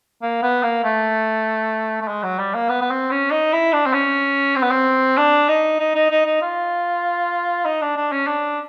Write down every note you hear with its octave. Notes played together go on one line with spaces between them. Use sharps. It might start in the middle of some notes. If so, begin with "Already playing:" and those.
A#3
B3
A#3
A3
A3
G#3
F#3
G3
A#3
B3
B3
C4
C#4
D#4
E4
D4
C4
C#4
C4
B3
C4
D4
D#4
D#4
D#4
D#4
D#4
F4
D#4
D4
D4
C#4
D4